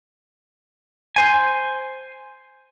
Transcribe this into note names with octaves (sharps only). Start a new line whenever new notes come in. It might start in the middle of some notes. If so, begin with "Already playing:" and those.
C5 G#5